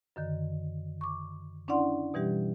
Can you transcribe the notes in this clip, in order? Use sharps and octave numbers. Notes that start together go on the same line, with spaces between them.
F#2 D3 D#3
C#6 D6
C#4 D4 E4 D5 F#5 C6
B2 E3 G3 G4